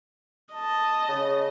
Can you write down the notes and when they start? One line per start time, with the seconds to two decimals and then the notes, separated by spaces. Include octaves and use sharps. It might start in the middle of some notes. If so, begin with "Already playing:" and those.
0.54 D#5 A5
1.09 C#3